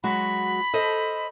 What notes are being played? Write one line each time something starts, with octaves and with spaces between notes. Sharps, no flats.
F#3 G#3 F#4 B5
A4 C5 D#5